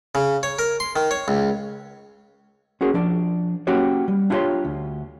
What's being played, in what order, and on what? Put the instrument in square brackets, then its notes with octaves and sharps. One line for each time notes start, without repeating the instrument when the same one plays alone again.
[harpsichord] C#3
C#5
A#4
C6
D#3
C#5
C#2
[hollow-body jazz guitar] C#4 F#4 G#4 A#4
F3 D4 D5
A#3 C#4 F#4 G4 C#5
G3
D4 E4 F4 G4 C#5 C6
D2